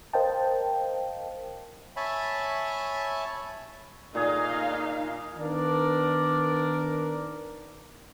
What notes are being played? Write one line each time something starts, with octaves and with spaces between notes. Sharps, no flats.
A#4 C5 D#5 F5 G5 A5
C#5 E5 G#5 A5 B5
A#2 D#4 G#4 F5
D#3 B3 D4 A#4 D5